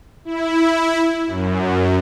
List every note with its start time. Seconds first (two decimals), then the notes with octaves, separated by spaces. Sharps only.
0.25 E4
1.27 F#2